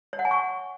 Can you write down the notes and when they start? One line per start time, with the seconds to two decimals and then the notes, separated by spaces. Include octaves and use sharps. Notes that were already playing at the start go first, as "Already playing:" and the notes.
0.13 C#5
0.19 F#5
0.25 G#5
0.31 C#6